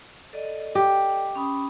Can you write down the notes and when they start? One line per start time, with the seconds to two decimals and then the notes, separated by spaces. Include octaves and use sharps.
0.33 A4 D5 D#5
0.75 G4
1.36 C#4 B5 D#6